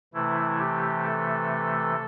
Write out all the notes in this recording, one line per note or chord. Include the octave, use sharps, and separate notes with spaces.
C3 E3 A3 E4
G4
A4